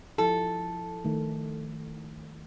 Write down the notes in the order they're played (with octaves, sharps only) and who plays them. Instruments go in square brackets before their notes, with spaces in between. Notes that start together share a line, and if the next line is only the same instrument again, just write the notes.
[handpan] F3 E4 [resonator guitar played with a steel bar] A4
[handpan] D#3 A3